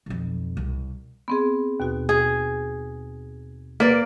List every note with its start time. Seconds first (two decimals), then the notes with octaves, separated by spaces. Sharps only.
0.06 B1 F2
0.57 C2
1.28 B3 C4 G#4
1.80 D#2 B2 F#4
2.09 G#4
3.80 A#3 B4 D5